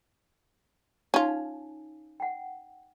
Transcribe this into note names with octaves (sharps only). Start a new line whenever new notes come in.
C#4 D#4 F4 A5
F#5 G5